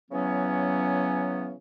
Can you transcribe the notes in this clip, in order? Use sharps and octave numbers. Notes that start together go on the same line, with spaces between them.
C#3 E3 F#3 B3 C#4